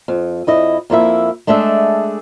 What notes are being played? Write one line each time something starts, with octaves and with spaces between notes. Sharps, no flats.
F2
F2 E4 D#5
F2 A#3 E4 E5
G#3 A3 D4 G#4 E5